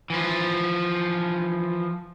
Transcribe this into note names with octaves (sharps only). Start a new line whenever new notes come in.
E3 F3